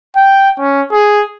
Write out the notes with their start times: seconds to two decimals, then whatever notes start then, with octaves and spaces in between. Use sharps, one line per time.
0.16 G5
0.60 C#4
0.92 G#4